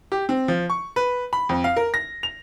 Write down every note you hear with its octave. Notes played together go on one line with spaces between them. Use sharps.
G4
C4
F3
C#6
B4
B5
F2
F5
A#4
A#6
F7